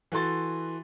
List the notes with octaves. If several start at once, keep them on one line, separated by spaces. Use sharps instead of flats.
E3 F#4 A4 C6 A6